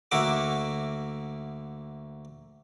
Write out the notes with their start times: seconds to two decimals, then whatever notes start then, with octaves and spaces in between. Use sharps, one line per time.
0.11 D2 A#3 F#4 E5 F#5 D6